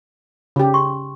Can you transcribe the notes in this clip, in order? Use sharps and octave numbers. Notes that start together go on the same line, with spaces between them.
C#3 G4
C6 C#6